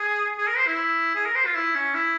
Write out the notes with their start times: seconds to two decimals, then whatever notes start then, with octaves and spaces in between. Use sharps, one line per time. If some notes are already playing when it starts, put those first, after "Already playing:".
Already playing: G#4
0.38 G#4
0.48 A#4
0.57 C5
0.67 E4
1.16 G#4
1.26 A#4
1.36 C5
1.46 F4
1.55 E4
1.75 C#4
1.94 E4